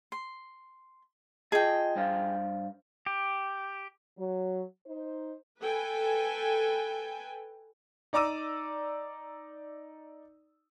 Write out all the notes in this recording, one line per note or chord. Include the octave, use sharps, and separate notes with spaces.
C6
F4 G#4 D#5 G5 A5
G2 C5 F5
G4
F#3
D#4 C5
A4 B4 G5 G#5
D#4 D5 A#5 D6 E6 D#7